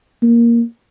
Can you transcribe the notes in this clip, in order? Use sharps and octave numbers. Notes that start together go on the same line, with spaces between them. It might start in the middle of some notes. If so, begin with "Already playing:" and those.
A#3